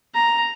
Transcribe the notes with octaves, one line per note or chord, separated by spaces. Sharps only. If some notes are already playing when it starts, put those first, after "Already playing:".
A#5